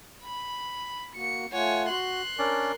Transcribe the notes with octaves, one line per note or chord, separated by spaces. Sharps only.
B5
A#3 F#4 C#7
A3 F4 C#5 F#5 G#5
F#4 C6 F#6
C#4 D4 A#4 D5